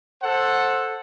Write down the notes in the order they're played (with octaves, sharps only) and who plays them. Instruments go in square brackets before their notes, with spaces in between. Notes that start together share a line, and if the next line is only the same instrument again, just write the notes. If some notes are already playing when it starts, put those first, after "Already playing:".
[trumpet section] A4 C5 F#5